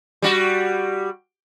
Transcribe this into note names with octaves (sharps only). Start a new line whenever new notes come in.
G3 F#4